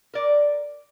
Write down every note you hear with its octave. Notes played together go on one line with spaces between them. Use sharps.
A#4 D5